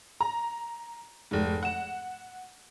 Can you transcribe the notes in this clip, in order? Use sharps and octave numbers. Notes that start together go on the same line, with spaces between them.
A#5
F1 G#2
F#5 E7